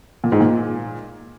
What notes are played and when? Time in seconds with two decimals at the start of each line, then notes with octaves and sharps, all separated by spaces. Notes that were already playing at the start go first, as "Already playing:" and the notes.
0.24 A#2
0.32 G#2
0.40 A#2